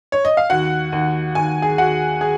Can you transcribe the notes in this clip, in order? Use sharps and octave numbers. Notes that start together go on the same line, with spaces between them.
C#5
D#5
F5
D#2 F#4 F#5
D#2
D#2 G#5
G#4 G#5
D#2 F#4 F#5
G#4 G#5